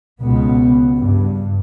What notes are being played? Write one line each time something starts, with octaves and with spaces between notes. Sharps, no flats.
C#2 B2 B3
G2